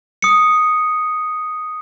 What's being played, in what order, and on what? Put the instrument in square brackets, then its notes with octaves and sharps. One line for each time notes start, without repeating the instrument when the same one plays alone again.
[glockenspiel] D#6 C#7